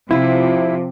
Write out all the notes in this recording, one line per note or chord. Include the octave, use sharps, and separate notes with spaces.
C3 F3 E4 F4